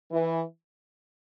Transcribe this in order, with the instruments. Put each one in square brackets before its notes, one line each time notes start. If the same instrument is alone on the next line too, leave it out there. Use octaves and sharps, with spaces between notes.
[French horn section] E3